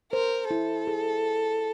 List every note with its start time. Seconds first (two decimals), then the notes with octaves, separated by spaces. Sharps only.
0.13 A#4 C5
0.50 E4 A4
0.87 G#4